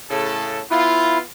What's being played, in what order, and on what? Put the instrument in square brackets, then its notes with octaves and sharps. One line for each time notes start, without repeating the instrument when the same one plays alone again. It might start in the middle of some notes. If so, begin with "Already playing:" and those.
[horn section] A2 C#3 A4
[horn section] B3 F4 [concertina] E4